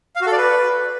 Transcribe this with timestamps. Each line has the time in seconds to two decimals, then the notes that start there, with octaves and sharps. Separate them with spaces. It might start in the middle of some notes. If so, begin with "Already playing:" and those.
0.16 F5
0.21 F#4
0.27 A4
0.32 D5
0.38 B4